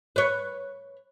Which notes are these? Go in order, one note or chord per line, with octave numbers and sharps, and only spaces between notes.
B4 C#5